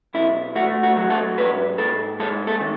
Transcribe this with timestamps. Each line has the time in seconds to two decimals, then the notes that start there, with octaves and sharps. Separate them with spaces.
0.14 B1 E4
0.56 A3 F#4
0.83 F#4
0.97 F#3
1.10 A4
1.37 G#2 B4
1.78 G#2 A4
2.20 G#3 A4
2.47 A4
2.61 D#3